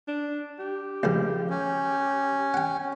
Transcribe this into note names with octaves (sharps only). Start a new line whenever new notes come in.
D4
G4
C#2 F#2 F3
C#4
F#5 G5